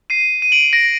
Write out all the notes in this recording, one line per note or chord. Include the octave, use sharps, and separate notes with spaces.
C7 D#7
D#7
D7 F#7
A#6 D7